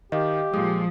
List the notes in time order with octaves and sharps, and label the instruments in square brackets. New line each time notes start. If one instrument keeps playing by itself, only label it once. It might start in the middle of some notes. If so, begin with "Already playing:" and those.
[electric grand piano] D#3 [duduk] G4 [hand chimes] D#5 F5
[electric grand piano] A#2 G#3 [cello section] F3 [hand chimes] D#6